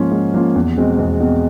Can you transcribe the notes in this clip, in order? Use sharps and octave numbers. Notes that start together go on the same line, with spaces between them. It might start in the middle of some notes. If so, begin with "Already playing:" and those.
Already playing: G#2 F3 A#3 C#4 F4
G#2
F3 A#3 C#4 F4
E2
B2 G#3 C4
E2
B2 G#3 C4